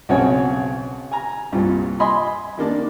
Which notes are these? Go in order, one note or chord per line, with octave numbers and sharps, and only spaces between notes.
B1 C#3 C4 F#4 C#5 G#5
G#5 A#5
C2 G2 A#2 F4
D#5 G#5 B5 C6
D#3 A#3 D4